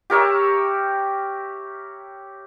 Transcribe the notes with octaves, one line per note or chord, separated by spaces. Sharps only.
G4 A#4 C#5 E5